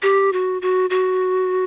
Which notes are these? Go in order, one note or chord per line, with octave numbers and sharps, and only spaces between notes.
G4
F#4
F#4
F#4